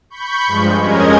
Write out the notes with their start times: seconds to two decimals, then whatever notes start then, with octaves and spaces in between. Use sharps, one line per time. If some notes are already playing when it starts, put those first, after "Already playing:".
0.10 B5 C#6 G6
0.47 G2 F3 G#3
0.80 F2 G#3 C#4 A#4 D#5 G#6